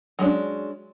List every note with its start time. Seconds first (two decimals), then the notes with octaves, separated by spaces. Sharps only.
0.19 F#3 G#3 C#4 D4